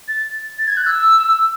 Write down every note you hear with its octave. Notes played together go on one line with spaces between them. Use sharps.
A6
A6
G#6
F#6
E6